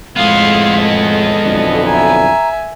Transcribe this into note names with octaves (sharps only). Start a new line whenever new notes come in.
F2 A2 G#3 B3 G#4 F5 C6
A4 D#5
B1 F2 D3
E5 G#5 A#5